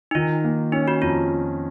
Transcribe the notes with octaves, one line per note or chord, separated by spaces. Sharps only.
D#4
D#3 F4
A#3
C#4 D#4
F#4
F2 F4